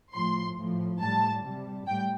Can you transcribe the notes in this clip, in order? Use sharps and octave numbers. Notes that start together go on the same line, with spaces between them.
A2 F3 C6
A2 F3
A2 G3 A5
C3 G3
A2 G3 G5